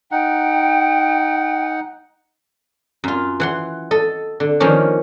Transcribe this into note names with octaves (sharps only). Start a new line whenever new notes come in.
D#4 F#5 G5
F#2 F4
E3 F#5 C6
A4 D#5
D3
D#3 F3 A#3 C#4 D4